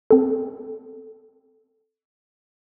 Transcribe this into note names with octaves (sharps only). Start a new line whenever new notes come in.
C4 A4